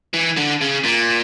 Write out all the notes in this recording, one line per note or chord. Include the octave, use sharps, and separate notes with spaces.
E3
D3
C#3
A#2